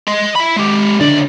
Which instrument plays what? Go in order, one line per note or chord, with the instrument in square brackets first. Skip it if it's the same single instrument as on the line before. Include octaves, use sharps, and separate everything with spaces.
[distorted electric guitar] D#5 C6
E5 B5
G#3 G4
[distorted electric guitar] C#2 D5 [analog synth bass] D3